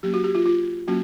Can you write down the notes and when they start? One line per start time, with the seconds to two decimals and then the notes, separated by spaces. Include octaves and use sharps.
0.03 F#3 A#3 C#4 G4
0.14 F#4
0.24 G4
0.35 F4
0.46 F4
0.88 F#3 A#3 C#4 F#4